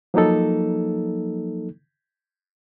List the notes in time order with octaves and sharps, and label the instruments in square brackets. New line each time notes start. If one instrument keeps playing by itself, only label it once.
[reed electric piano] F3 F#3 A#3 D#4 A4